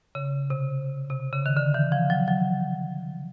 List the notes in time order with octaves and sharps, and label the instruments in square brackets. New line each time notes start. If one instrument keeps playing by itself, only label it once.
[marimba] C#3
C3
C3
C#3
D#3
D3
E3
F3
F#3
F#3